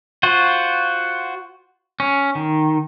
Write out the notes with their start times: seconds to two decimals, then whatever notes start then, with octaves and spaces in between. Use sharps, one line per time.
0.23 F4 F#4 C5
2.00 C#4
2.35 D#3